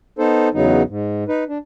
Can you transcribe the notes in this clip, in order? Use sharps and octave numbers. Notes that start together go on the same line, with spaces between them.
B3 D#4 A4 C5
E2 C#3 F#3 B3 D#4
G#2
D#4 B4
D4